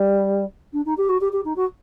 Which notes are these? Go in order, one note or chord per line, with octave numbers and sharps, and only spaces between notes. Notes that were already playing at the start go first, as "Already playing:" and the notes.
Already playing: G3
D4
D#4
G4
F#4
G4
G4
D#4
F#4